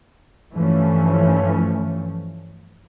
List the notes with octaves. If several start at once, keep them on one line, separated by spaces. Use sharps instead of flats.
G2 E3 F3 A3 C#4